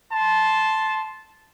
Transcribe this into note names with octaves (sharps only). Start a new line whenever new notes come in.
A5 C6